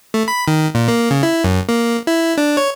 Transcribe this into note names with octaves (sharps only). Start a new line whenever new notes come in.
A3
B5
D#3
A#2
A#3
C#3
E4
F#2
A#3
E4
D4
C#5